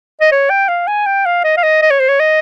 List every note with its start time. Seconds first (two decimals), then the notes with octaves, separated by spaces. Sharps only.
0.21 D#5
0.31 C#5
0.50 G5
0.68 F5
0.87 G#5
1.06 G5
1.26 F5
1.44 D#5
1.57 F5
1.63 D#5
1.82 D#5
1.90 C#5
1.99 C5
2.08 C#5
2.20 D#5